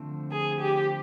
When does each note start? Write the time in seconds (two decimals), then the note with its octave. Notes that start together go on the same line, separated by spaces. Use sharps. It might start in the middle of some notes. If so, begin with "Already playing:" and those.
Already playing: D3 F3 A3 C4
0.31 G#4
0.61 G4